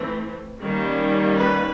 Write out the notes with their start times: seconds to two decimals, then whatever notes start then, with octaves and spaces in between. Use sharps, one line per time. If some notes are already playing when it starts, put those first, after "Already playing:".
Already playing: E3 A3 C4
0.61 D#3 G3 A#3 C#4
1.38 B4